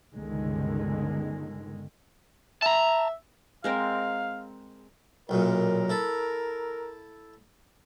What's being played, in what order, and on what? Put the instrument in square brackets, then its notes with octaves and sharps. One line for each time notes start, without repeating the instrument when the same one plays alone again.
[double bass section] G1 C#2 D3 D#3 G#3
[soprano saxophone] E5 [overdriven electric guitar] A5 A#5
[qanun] G#3 C4 A#4 [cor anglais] F5
[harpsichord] B1 F#2 A#2 [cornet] A#4
[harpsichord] E4 A4